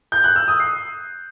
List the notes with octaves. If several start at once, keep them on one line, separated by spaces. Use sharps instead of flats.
G6
F#6
E6
D#6
C7